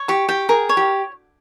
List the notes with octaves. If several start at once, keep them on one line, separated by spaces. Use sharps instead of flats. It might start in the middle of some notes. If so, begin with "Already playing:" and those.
Already playing: C#5
G4 C#6
G4 G5
G#4 A#4
C#5
G4